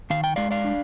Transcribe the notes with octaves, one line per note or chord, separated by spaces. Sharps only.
D#3 F5
G5
G#3 D5 F5
D5 F5
D4